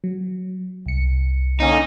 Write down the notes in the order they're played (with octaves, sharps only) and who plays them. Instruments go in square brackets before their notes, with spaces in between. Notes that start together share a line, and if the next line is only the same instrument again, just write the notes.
[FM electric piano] F#3
C2 C#7
[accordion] D3 A#3 C#4 [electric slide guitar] D#4